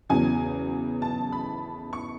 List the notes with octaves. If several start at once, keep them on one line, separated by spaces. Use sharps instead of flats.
E2 C#3 F#3 G#5
A5
B5
C#6